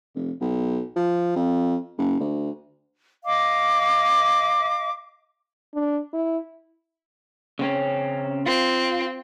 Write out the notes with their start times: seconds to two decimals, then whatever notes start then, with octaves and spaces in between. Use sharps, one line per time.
0.15 F1
0.41 B1
0.96 F3
1.36 F2
1.98 F#1
2.20 D2
3.24 D#5 F5 D6
5.74 D4
6.13 E4
7.59 C#3 C4 C#4
8.46 C4 F4